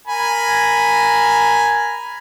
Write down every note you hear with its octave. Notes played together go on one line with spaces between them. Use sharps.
A#4 G#5 B5